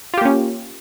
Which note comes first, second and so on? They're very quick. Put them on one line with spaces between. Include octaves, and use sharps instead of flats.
F4 G4 A#3 C#4